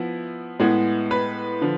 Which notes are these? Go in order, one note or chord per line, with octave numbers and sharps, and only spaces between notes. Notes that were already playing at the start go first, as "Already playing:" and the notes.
Already playing: F3 B3 E4
A2 G#3 B3
B4
D3 F3